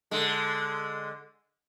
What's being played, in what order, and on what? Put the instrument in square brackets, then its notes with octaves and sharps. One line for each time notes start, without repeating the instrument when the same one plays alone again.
[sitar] D3 G#3